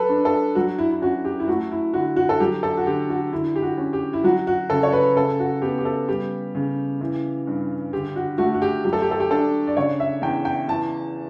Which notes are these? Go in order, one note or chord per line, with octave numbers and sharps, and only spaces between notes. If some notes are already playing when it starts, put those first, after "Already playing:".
Already playing: F#3 A4 B4
D4
A4
F#3 F#4
E4
E4
C#4 F#4
G4
E4
A3 F#4
E4
D3 F#4
F#4
A4
F#3 G4
A4
F#4
D3 G4
F#4
D3 E4
G4
F#4
C#4
G4
E4
F#3 F#4
F#4
C#3 A4
C#5
B4
C#3 A4
F#4
B3 G4
G4
A4
G3 G4
C#3
E3
G2
D3 G4
F#4
A3 F#4
F#4
G4
F#3 G4
A4
G4
A4
G4
D4 A4
D5
C#3 C#5
E5
E2 G5
G5
E3 A5